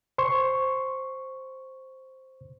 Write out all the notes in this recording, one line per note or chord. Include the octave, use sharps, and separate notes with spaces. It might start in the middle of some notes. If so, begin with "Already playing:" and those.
C5 C6 C#6